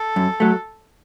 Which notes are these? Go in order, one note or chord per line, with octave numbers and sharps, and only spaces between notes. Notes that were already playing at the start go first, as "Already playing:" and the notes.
Already playing: A4
F#2
F#3 A3